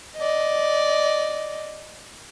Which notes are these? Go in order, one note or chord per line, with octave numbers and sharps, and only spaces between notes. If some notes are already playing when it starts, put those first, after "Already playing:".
D5 D#5